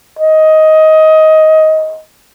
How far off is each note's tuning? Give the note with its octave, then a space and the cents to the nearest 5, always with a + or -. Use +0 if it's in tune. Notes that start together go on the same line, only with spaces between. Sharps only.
D#5 +15